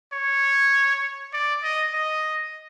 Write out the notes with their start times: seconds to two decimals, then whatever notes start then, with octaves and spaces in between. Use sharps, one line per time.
0.13 C#5
1.33 D5
1.63 D#5
1.93 D#5